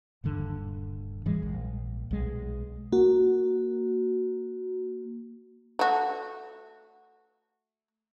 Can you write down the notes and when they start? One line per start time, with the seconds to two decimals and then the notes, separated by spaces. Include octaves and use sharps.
0.24 D#1 G2 D3
1.26 G#2 E3 G3 G#3
1.42 A#1
2.11 B1 G#3
2.92 A#3 F#4
5.79 A3 F#4